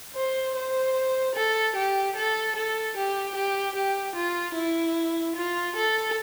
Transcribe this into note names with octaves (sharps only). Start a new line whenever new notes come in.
C5
C5
A4
G4
A4
A4
G4
G4
G4
F4
E4
F4
A4